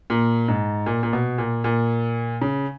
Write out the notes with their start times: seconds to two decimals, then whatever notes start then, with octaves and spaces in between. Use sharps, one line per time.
0.10 A#2
0.48 G#2
0.86 A#2
1.03 A#2
1.13 B2
1.38 A#2
1.64 A#2
2.42 C#3